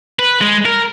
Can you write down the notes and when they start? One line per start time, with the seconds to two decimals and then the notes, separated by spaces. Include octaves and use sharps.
0.19 B4
0.41 G#3
0.66 A#4